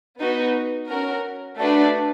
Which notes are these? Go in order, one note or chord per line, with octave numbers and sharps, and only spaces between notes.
B3 D#4 F#4 B4
C#4 F#4 A#4
A3 D4 F#4 B4 D5